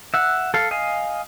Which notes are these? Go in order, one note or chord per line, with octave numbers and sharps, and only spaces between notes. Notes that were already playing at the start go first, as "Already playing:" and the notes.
E5 F#5
A4 F5
D#5 F5 G#5